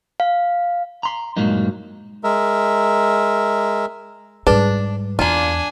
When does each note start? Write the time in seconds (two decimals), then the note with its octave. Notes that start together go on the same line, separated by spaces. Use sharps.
0.20 F5
1.03 A#5 C6
1.36 G2 A#2 F#3 G#3 A#3 D#4
2.24 G#3 A#4 E5
4.47 G#2 G3 D4 G#4 B4
5.19 E2 A#3 D4 F4 G#5